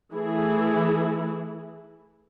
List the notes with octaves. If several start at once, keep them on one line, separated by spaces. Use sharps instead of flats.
E3 A3 E4 G#4